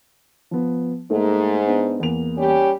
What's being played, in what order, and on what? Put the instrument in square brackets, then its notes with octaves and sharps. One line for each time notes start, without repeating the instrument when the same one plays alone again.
[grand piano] F3 B3
[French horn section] G#2 [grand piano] A3 A#3
[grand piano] B3 D4
E2 A#3 F7
[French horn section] G3 C#4 G4